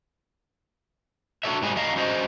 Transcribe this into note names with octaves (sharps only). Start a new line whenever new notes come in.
D4 F#4 A4 C#5 E5
G#2 F#3 G3 A#3 G#4
F#2 C#4 D#5 F5 A#5
G2 C#4 F#4 C5 D#5